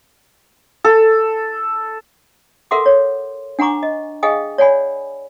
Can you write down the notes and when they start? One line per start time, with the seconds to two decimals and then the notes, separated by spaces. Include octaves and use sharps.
0.84 A4
2.71 A4 A#4 E5 F#5 C6 D6
2.86 C#5
3.59 D4 F#5 G#5 A#5 C#6 D6
3.83 D#5
4.23 G#4 D#5 F5 G5 G#5 D#6
4.58 C#5 D5 F#5 G#5 B5